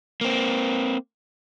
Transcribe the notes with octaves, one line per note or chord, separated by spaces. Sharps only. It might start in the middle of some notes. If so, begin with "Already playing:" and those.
A#3 C4